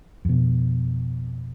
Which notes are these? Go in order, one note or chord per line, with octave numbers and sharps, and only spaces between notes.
F2 B2